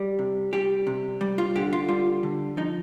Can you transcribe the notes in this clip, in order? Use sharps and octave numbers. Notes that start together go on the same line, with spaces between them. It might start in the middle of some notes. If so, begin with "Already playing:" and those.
Already playing: G3
C3
G3 G4
C3
G3
F4
D3 G4
F4
G3 F4
D3
F3 D#4